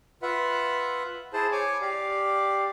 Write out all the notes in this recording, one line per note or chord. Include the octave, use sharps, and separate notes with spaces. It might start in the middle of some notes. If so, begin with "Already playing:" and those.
F4 B4 E5 F#5
E4 G#4 C5 A5
C#5 G#5 C#6 D6
G4 D5 F5